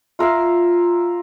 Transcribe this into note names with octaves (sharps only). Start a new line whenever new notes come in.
F4 A#4 E5 F5